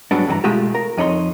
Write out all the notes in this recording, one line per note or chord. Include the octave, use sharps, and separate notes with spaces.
G#2 F#3 G3 B3 D4
G2 E3 A#4 A#5
B2 G#3 A3 F4 G4 A4
A#4
F2 D#4 C#5 B5 C6